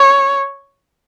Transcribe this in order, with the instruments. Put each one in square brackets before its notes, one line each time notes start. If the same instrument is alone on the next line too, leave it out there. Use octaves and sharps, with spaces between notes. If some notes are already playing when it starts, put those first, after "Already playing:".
Already playing: [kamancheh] C#5